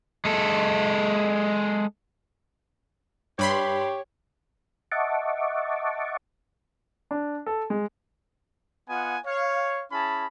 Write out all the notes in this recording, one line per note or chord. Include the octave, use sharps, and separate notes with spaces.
G#3 A4
G2 G4 C#5 B5 C6
D#5 E5 F#5 A5 C#6 D6
D4
A4
G#3
B3 F4 D#5 F#5 G#5
C#5 F5
C#4 E4 G#4 A5 B5